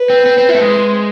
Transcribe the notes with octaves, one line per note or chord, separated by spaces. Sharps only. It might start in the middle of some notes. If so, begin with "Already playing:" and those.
Already playing: B4
C4
C4
C4
E4
A3
G#3 C5